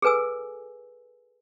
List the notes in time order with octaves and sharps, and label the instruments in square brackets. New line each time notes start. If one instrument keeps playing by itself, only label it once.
[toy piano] G#4 A4 B4 G#5 E6